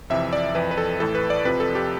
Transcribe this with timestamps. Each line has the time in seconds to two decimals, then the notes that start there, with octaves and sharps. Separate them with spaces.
0.10 F2 C3 E3 E5
0.33 D5
0.55 F2 E3 B4
0.71 B4
0.78 A4
1.00 A2 E3 A4
1.15 B4
1.30 D5
1.45 F2 C3 F3 B4
1.60 A4
1.75 G4